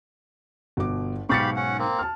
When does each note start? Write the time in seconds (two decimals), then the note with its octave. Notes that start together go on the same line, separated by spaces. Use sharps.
0.77 G1 B2 D6
1.29 B1 G#2 G4 F5 B5 C#6 A6 C#7
1.56 C#4 F#5
1.79 A#3 C4
1.99 A5 F6